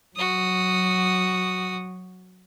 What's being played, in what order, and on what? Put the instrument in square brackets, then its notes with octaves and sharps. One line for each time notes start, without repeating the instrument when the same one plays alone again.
[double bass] F#3 [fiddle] F#4 D#6